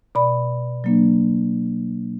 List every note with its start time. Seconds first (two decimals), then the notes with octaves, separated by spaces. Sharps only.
0.15 B2 D5 B5
0.84 F#3 A#3 D4